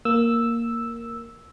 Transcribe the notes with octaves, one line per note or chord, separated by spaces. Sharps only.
A#3 E6